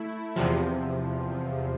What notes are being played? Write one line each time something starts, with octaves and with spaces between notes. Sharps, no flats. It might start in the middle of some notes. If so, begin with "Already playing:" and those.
Already playing: A3 E4
E2 C3 F3